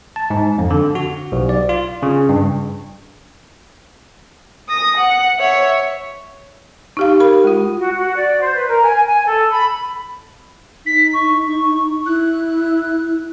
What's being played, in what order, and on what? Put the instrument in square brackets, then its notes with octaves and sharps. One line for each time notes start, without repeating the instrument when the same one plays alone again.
[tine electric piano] A5
G#2
F2
D3
F#4
B1
D5
F4
C#3
G2
[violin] D#6 A#6
F#5
C#5 E5
[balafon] D#4 G4 F5
G4 A#4 B5
G#3 F4
[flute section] F#4
F#4
D5
C5
B4
A#4
G#5
G#5
A4
B5
[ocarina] D#4 [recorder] B6
[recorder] C#6
[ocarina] E4 [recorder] F#6